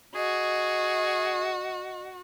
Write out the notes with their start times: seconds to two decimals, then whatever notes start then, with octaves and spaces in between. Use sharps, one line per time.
0.15 F#4 G#4 D#5